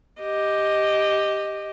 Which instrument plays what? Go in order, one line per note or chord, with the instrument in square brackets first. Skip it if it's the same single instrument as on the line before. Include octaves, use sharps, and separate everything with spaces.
[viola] G4 D#5